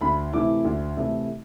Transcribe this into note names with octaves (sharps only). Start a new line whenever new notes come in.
D2 B5
C3 E3 A3 E4 D6
D2
C3 E3 A3 E4